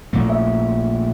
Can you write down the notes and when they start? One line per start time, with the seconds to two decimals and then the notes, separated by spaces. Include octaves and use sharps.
0.13 A#1 A#2 A3
0.30 E5